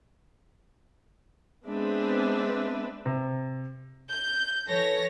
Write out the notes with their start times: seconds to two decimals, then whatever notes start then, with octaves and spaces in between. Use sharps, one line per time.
1.68 G#3 B3 C4 D4 B4 E5
3.05 C3
4.09 G6
4.68 E3 A4 C#5 A#6